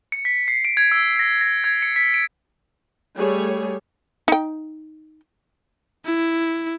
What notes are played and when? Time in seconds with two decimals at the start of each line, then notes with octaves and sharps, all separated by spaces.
0.12 C#7
0.25 B6
0.48 C7
0.65 D7
0.77 G#6
0.92 E6
1.19 A#6
1.41 A#6
1.64 G#6
1.82 C#7
1.96 B6
2.14 D7
3.16 G3 A3 G#4 C#5
4.28 D#4 G5
6.06 E4